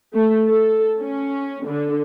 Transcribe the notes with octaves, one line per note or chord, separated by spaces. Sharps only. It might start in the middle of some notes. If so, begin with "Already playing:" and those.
A3
A4
C#4
D3